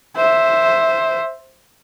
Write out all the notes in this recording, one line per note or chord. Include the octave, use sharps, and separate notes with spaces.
C5 E5